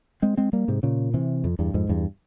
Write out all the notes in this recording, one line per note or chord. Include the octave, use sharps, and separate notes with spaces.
G#3 C4
G#3 C4
G3 A#3
G#2 C3
A#2 C#3
C3 E3
F2
E2 G2
F2 G#2
E2 G2